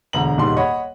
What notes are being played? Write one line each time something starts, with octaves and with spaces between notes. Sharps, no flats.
E1 D2 A#5 F#7
D#1 C#2 G#2 G3 C6
C#5 D#5 F#5 B5 C#6